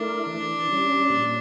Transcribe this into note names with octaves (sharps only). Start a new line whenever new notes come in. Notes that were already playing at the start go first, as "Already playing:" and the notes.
Already playing: A3 D4 E4 A#4
E3
G3 C#4
A#2